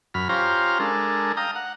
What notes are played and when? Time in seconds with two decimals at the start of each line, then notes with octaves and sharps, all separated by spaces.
0.14 F#2 B5 F6
0.29 C#4 F4 G4 C5 F5 A#5
0.80 G#3 D4 A4 A#4
1.37 F5 G5 A#5 D#6
1.55 F#5